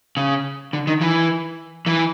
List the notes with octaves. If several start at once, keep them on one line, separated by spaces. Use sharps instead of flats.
C#3
D3
D#3
E3
E3